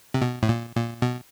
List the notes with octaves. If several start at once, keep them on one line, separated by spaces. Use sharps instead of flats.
C3
B2
A2
A#2
A#2
B2